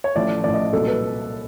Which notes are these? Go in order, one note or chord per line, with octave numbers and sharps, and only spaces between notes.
C#5
A1 A2 F3 D5
A1 A2 F3 D5
D#5
C2 A#2 F#3 A4
B4